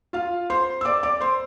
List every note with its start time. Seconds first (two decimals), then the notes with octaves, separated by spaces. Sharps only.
0.13 F4 F5
0.50 C5 C6
0.81 E6
0.85 D5 D6
1.03 D5 D6
1.21 C5 C6